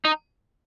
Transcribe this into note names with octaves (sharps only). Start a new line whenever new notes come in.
D#4